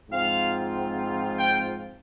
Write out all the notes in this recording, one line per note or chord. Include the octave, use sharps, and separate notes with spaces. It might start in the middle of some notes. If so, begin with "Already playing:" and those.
G#2 F3 C4 F4 F5
G5